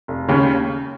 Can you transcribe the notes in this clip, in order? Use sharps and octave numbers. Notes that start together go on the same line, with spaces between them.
F1
D#2 C#3